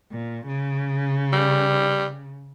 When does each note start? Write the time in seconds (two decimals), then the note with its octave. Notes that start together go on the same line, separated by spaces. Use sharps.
0.12 A#2
0.47 C#3
1.33 G3